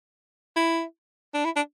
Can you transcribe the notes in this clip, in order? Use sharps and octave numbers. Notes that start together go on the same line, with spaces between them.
E4
D4
E4
D4